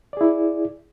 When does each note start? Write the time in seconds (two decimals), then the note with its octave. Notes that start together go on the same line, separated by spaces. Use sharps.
0.13 D5
0.17 G#4
0.21 E4